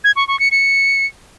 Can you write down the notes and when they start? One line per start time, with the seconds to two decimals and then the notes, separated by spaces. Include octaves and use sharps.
0.04 G#6
0.16 C#6
0.28 C#6
0.40 C#7
0.51 C#7